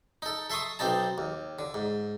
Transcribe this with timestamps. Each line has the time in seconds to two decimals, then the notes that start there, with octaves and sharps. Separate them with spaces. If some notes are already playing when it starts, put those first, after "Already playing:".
0.22 D#4 A4
0.50 A4 E5 C6 C#6 D#6
0.79 B1 C4 D#4 A5
1.18 D#2
1.59 D3
1.74 G#2